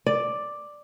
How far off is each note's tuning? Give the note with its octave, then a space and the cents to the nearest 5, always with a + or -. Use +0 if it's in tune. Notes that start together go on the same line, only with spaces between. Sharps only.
D5 +5